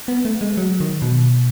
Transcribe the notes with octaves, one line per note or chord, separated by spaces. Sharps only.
B3
A3
G#3
F#3
D#3
B2